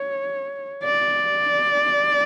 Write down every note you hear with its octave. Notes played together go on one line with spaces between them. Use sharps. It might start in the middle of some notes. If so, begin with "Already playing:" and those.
Already playing: C#5
D5